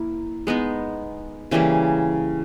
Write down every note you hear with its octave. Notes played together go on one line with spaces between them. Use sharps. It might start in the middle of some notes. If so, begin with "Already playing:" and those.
Already playing: A#3 E4
G#3 B3 D#4
C#3 E3 G3 A#3